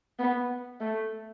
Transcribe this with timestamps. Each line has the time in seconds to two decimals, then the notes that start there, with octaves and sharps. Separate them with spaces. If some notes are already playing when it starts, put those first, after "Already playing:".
0.19 B3
0.81 A3